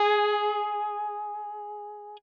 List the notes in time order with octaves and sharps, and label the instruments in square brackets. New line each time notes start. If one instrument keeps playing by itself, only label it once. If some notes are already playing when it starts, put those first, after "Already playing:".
Already playing: [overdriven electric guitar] G#4